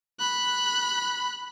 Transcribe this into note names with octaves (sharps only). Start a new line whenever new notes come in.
B5 F#6